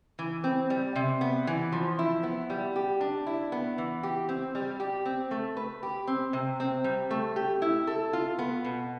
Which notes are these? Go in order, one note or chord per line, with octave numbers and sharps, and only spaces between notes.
E3
C4
G3
C3
B3
E3
F3
E4
B3
G3
G4
D4
E4
B3
E3
G4
C4
G3
G4
C4
A3
B4
G4
C4
C3
C4
G3
A3
G4
E4
A4
F4
B3
B2